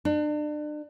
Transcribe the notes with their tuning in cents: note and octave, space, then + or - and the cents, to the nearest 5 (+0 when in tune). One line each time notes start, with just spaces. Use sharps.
D4 +35